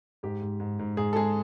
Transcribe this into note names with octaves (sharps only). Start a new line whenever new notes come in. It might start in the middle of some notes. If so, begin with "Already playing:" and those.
G#2 G4
G#2
G#2
G#2
G#2 G#4
A4
G#3 G#4